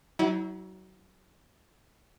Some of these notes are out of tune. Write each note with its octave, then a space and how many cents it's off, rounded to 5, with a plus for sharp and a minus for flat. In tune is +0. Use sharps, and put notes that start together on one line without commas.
F#3 +25 E4 -35